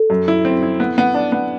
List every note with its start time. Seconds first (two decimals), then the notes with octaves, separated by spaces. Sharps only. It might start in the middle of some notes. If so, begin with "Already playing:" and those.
Already playing: A4
0.10 F#2
0.28 E4
0.45 C4
0.63 E4
0.80 B3
0.98 B3
1.14 D4
1.32 B3